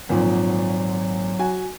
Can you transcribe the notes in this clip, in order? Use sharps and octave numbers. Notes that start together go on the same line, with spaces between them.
G#1 A#2 F3 F#3
F#4 G#5